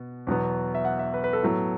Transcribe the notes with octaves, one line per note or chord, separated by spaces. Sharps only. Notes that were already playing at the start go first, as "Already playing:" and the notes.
Already playing: B2 B3
E2 B2 F#3 B3
E5
F#5
E5
B4
B4
A4
A2 F#3 B3